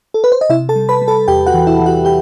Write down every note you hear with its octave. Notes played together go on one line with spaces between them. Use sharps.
A4
B4
C5
D#5
C3 E4 E5
A4 A5
G3
B4 B5
G3
A4 A5
E2 G4 G5
F#4 F#5
E3
E4 E5
E3
F#4 F#5
G4 G5